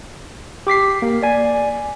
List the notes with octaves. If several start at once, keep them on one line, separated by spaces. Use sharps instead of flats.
G4 D6 B6 C7
A#3
D5 G#5